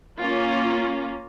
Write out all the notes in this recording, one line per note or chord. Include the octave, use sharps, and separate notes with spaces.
A#3 C#4 F4